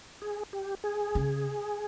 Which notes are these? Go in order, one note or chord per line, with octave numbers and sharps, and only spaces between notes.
G#4
G4
G#4
C#3